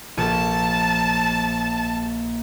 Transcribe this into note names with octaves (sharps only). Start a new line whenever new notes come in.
A#1 A5